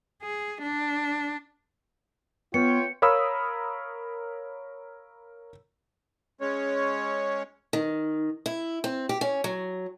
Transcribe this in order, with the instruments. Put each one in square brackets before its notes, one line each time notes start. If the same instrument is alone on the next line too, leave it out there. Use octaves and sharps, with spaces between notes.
[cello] G#4
D4
[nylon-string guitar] B3 [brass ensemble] F4 C#5 G5 [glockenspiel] C#7
[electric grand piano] A#4 C#5 F5 B5 D#6 E6
[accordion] G#3 C#4 C#5
[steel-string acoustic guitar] D#3
E4
C4
G4
C#4
F#3